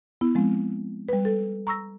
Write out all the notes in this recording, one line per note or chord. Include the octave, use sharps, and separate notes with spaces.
B3 E4
F3 G#3 C4
G3 B4
A4
A#5 C#6 E6 A#6